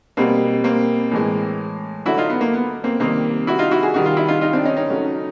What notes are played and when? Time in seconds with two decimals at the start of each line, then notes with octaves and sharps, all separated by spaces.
0.17 B2 G3 A#3 C4
0.64 A#3 C4
1.11 A2 E3 G#3
2.06 D3 F#3 A3 E4 F#4
2.18 D#4 F4
2.30 B3
2.41 A#3
2.54 B3
2.84 A#3 C4
3.00 C3 D#3 G3 A#3 C4
3.47 E4 F#4
3.59 D#4 F4
3.71 E4 F#4
3.83 F#4 G#4
3.94 C3 D#3 G3 F#4
4.06 F4
4.17 E4
4.28 D#4 F4
4.41 D#4 F4
4.53 C4 D4
4.65 C#4 D#4
4.77 C#4 D#4
4.88 C#3 F#3 A3